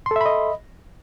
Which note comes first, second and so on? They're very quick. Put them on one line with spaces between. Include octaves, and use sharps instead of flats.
C6 A4 E5 B5 D#5